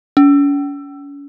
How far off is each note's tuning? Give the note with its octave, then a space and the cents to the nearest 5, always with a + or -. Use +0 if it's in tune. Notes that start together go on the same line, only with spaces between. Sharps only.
C#4 +40